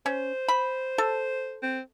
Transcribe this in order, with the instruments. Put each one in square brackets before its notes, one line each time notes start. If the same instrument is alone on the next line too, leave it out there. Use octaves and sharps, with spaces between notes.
[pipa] C#4 [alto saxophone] C5
[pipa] B5
A4
[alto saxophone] C4